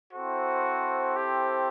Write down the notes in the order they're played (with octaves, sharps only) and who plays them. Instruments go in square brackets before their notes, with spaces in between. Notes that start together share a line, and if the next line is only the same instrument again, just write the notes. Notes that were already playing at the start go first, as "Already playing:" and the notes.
[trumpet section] C4 E4 A4 C5 [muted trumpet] F#4
[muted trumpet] G4